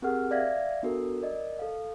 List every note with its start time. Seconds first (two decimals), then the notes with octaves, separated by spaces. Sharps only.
0.02 C4 G4 G#4 A#4 F#5 F6
0.31 D5 E5 F5 G#6 A#6
0.83 B3 D4 F#4 A4 A#4
1.22 A#4 D5 D#5
1.59 A4 F5